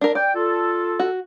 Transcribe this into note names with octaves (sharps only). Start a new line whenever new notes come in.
D4 A#4
D5 G5
F4 A4
F#4